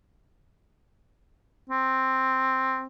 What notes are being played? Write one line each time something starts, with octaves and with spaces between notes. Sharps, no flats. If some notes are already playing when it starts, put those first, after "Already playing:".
C4